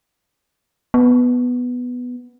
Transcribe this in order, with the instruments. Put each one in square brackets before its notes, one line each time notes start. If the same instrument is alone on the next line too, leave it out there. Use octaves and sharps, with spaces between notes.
[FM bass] B3